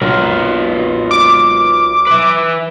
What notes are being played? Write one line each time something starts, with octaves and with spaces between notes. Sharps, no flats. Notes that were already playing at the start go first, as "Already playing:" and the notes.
B1 F4 A#4 B4
D6
B4 E5